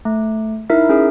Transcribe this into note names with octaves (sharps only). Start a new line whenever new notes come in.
A3
D#4 E4 A#4 E5
C#4 G#4 A#4